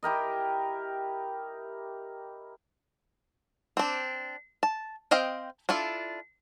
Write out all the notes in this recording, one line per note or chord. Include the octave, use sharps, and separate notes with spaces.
E4 G4 A#4 D#5
C4 D4
A5
C4 D#5 F5 G5
D4 E4 F4 A4